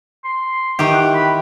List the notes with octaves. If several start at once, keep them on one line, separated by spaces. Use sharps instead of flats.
C6
D#3 E3 G4
F#5
B5